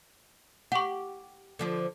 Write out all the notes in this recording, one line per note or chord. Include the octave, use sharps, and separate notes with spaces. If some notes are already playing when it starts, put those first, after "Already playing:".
G4 F#5 C#6
D3 F3 D4